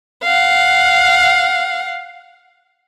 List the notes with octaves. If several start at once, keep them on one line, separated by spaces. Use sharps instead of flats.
F5 F#5